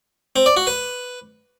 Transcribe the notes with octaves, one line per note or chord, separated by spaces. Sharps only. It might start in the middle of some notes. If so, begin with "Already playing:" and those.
C4
D5
F#4
B4